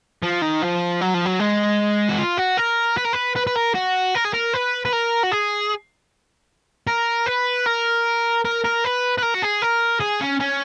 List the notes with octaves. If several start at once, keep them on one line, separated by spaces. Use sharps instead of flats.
F3
D#3
F3
F#3
F3
F#3
G#3
F#4
F4
F#4
A#4
B4
A#4
B4
B4
B4
A#4
F#4
A#4
G#4
A#4
B4
B4
A#4
F#4
G#4
A#4
B4
A#4
A#4
A#4
B4
B4
A#4
F#4
G#4
A#4
G#4
C#4
C#4